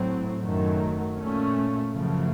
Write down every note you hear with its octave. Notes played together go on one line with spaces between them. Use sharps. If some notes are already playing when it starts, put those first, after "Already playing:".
Already playing: A2 F#3 C4
F#2 D#3 F#3 A3
A#2 A3 C#4
F#2 C#3 F3 A3